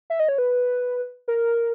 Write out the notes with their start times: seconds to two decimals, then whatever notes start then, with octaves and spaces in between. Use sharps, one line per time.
0.10 E5
0.20 D#5
0.29 C#5
0.38 B4
1.28 A#4